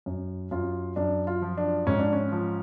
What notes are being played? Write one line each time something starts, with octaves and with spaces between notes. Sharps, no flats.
F#2
F#2 F4
F#2 D4
F4
F3
D4
G#2 C#4
D4
C#4
F3